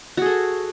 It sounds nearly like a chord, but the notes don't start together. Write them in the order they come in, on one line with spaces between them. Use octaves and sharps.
F#4 G#4 A4